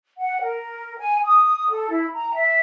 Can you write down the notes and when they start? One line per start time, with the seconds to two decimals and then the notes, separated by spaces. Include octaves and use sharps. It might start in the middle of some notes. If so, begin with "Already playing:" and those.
0.19 F#5
0.41 A#4
0.98 G#5
1.24 D#6
1.69 A4
1.90 E4
2.14 A#5
2.33 E5